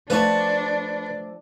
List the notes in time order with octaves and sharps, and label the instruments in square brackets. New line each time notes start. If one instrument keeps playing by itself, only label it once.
[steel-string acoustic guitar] F3 A3 A5 [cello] D4 [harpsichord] B4 C#6